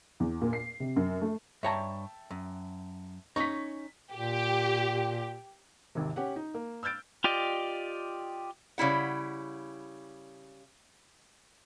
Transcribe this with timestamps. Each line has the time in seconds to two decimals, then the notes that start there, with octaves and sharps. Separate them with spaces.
0.20 E2
0.42 A#2
0.53 C7
0.80 C3
0.96 F#2
1.22 A3
1.63 G2 C#5 E5 G5 A5 A#5
2.31 F#2
3.36 C#4 D#4 C#6 B6
4.13 A#2 G4
5.95 G#1 D#2 C3
6.16 C#4 G4 F#5
6.36 D#4
6.54 A#3
6.83 E6 F6 G6 A6 D7
7.24 F4 G4 D5 D#5
8.78 C#3 G3 E4 F#5